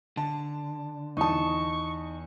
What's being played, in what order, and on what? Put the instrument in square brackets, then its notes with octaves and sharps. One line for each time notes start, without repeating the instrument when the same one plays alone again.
[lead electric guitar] D3 [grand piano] A5
[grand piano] E2 D#6 [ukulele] D#4 A5 [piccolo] C#6